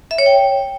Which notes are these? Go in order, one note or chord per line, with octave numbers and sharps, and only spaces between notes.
E5
C#5
G5